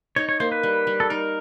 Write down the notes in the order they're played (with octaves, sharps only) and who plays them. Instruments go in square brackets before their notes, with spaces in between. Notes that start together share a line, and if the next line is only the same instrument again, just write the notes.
[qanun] D#4 [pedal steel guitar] C#5
[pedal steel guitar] C#5
[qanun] A#3 [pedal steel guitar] C5
[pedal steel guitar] B4
[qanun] G3
G3
[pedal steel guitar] A4
[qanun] D#4 [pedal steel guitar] A#4